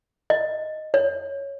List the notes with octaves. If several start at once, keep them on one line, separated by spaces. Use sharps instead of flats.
D#5
C#5